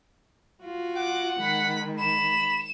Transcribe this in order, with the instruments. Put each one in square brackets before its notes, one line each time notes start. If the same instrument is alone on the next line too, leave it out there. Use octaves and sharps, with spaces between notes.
[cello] F4 F#4
[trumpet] F#5 [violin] D6
[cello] D#3 G#3 [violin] B5 B6
[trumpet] B5 [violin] E7